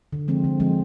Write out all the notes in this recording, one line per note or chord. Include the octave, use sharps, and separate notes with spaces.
D3
F3 G#3 C4
D3
F3 G#3 C4